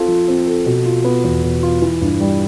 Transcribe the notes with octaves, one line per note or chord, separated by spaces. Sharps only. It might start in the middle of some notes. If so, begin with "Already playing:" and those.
Already playing: C4 F4 A4
F3
C4
A4
B2
F4
B3
E2
B2
F4
E3
G2
G3